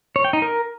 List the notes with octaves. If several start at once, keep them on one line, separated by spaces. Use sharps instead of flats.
C#5
G5
D#4
A#4